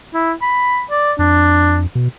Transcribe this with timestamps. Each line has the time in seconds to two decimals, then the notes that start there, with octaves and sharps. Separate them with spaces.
0.14 E4
0.42 B5
0.91 D5
1.19 F2 D4
1.95 B2